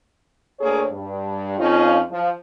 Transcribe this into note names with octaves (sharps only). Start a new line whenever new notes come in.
D2 A#3 G#4 C#5
G2
F2 F3 C#4 D#4 F4
F3